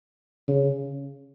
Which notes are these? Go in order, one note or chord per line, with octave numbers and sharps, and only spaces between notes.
C#3